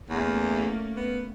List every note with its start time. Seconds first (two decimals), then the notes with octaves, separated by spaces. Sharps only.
0.10 E2 A3 A#3 C#4
0.97 B3